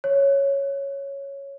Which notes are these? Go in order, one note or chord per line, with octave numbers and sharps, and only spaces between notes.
C#5